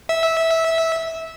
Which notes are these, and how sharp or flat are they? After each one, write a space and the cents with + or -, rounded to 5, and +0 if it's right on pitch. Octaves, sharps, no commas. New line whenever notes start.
E5 -15